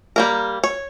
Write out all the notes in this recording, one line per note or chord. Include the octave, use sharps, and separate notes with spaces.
G3 A#3 A#4
C#5